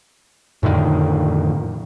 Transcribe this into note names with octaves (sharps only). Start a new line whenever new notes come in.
F2 A2 D3 D#3